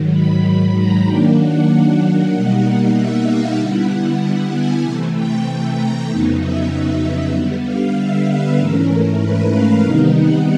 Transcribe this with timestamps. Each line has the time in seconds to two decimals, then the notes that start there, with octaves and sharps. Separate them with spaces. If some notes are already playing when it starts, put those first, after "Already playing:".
Already playing: G#2 D#3 F#3
0.13 B5
0.76 A#5
1.06 D#3 F#3 A#3 D4 G5
1.38 F#5
2.31 B2 G3 A#3 D#4 F#5
2.95 E5
3.26 F5
3.57 D3 G3 B3 E4 F#5
4.52 G#5
4.82 C3 E3 A3 A5
5.14 G5
5.76 A#5
6.08 F2 C#3 F#3 B3 D#4 A5
6.40 E5
7.32 D3 G3 B3
7.64 F5
7.96 E5
8.27 B4
8.58 G#2 E3 A3 C#4 A#4
9.20 B4
9.52 F5
9.83 C3 D#3 G3 B3 D#4 F5
10.15 F#5